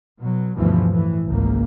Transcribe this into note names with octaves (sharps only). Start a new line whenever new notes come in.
B2 F#3
D2 G2 B2 E3 F3
A2 E3
G#1 C#2 A#3